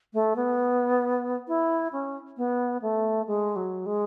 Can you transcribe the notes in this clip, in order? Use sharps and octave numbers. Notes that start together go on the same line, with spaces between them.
A3
B3
E4
C#4
B3
A3
G#3
F#3
G#3